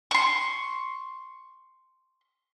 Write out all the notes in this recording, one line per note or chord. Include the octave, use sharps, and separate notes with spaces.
C6 C#6